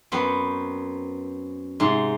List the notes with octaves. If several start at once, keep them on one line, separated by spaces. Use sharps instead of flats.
F#2 B3 C4
G#2 C3 G#4